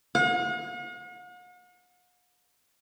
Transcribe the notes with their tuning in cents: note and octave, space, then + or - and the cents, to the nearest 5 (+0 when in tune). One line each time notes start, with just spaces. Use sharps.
F#5 -45